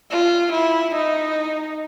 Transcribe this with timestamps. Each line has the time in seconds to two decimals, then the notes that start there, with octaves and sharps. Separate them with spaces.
0.11 F4
0.52 E4
0.95 D#4